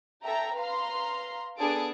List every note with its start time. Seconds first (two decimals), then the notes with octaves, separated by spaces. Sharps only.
0.24 A4 E5 G5 A#5
0.55 B4 F5 A#5 C6
1.57 B3 D4 G#4 A4 A5 D7